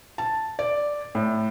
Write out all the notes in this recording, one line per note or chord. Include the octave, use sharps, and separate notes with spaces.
A5
D5
A2